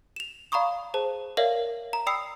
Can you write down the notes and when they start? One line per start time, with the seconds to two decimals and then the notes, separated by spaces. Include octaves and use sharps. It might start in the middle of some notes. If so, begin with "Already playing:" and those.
0.16 E7 F7
0.52 D5 F5 A#5 B5 C#6 D#6
0.94 G#4 C5 A5
1.37 A#4 C#5 D5 E5 F5
1.93 A#5
2.06 D5 G5 B5 D#6 E6 C7